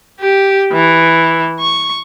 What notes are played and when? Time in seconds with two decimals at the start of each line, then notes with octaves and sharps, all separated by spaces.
0.20 G4
0.72 E3
1.60 C#6